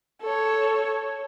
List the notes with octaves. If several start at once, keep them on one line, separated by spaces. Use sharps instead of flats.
A4 C#5